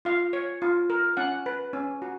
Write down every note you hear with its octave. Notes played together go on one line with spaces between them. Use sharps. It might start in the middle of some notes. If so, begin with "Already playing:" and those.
F4 F5
C#5
F4
A#4
C#4 F#5
B4
C#4
F#4